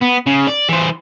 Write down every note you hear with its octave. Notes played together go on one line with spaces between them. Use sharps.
B3
C#3
D5
E3 C5